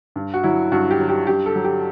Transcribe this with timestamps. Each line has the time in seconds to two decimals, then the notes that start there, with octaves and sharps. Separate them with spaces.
0.16 G2
0.34 F#4
0.44 F#3 E4
0.72 G2 F#4
0.91 G4
0.99 F#3
1.09 G4
1.27 G2 G4
1.46 A4
1.56 F#3
1.64 G4